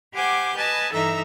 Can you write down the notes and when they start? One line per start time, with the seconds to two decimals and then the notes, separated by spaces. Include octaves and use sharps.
0.12 G4 C5 F#5 G#5 D6 G6
0.55 B4 D#5 G#5 A5
0.91 G2 E3 D#4 A4 E5 A#5